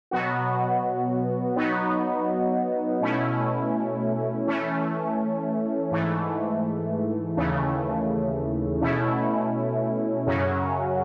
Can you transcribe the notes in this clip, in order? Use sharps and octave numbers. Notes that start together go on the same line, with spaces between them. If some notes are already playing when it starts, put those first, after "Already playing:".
B2 F#3 B3 F#4
F#3 B3 D#4 F#4
B2 A3 C#4 E4
E3 A3 C#4
G#2 E3 A3
D#2 C#3 E3 A3
B2 A3 C#4 E4
F#2 C#3 F#3 C#4 F#4